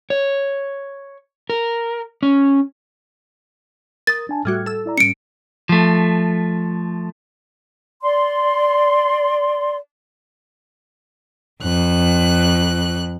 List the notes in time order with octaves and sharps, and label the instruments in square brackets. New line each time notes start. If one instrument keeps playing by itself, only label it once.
[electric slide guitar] C#5
A#4
C#4
[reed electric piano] A#4 D#6 [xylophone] A6
[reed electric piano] D4 G#5 A5
[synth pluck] A2 G3 F#4 [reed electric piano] F6 G#6
[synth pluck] A4 E6
[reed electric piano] E4 D5 A#5
[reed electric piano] G#2 G3 C#4 [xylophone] C#7 D7
[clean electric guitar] F3 A3
[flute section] D5 C6
[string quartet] F2 F#6